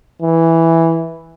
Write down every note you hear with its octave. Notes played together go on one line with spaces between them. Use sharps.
E3